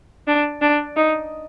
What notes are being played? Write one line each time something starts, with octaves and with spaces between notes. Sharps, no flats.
D4
D4
D#4